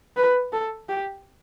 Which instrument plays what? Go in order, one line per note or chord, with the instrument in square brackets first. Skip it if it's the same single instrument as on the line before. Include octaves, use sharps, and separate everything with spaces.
[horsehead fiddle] B4
A4
G4